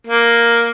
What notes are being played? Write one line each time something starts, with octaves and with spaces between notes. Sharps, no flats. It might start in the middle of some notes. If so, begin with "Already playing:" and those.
A#3